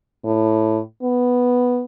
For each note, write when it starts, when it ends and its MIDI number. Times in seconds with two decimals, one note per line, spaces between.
0.25 0.79 45
1.03 1.83 59